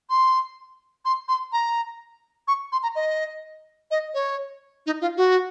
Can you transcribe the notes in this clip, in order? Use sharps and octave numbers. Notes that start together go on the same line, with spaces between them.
C6
C6
C6
A#5
C#6
C6
A#5
D#5
D#5
C#5
D#4
F4
F#4